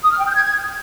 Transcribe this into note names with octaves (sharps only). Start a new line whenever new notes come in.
D#6
F6
G5
G6
G#6